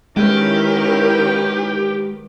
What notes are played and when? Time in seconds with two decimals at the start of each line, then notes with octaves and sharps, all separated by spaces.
0.17 D#3 G#3 C#4 E4 F#4 G4 A#4 B4